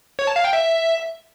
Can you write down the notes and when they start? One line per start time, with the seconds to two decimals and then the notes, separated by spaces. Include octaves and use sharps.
0.19 C#5
0.27 A5
0.36 F5
0.44 G5
0.53 E5